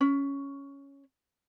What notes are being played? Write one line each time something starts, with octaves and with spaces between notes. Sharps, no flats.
C#4